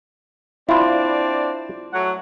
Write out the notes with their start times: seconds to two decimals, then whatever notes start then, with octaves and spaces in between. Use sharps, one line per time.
0.69 C4 D4 E4 F4 D5
1.94 F#3 A3 F#5